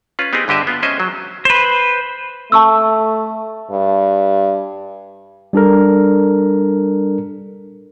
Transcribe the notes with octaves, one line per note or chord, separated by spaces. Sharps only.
C#4 F4 B4
B3 C4 D#4 G4 G#4
G2 D3 G4 D#5 E5
B3 F4
G#3 C#4 C5 D#5 E5
F#3
B4 C5
A3 A5 C#6 E6
G2
G3 D4 A4 A#4